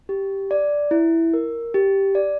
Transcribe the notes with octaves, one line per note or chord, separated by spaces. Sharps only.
G4
D5
E4
A#4
G4
D5